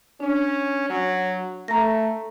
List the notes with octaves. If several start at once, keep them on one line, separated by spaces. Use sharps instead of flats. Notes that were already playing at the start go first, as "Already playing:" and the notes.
C#4 D4
F#3
A3 A#5 A#6